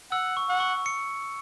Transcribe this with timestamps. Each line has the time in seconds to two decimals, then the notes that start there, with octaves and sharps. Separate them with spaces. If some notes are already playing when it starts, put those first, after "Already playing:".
0.11 F#5 E6
0.37 C#6
0.49 F#5
0.60 C#6
0.86 C#7